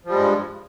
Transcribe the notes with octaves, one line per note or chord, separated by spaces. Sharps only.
G2 F3 G3 G#3